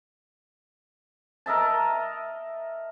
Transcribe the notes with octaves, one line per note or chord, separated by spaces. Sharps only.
A#4 D#5 E5 A5